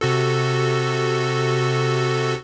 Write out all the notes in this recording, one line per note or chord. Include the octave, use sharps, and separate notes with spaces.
C3 F#4 A4